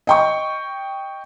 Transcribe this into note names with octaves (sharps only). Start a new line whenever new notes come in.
D#5 G5 C#6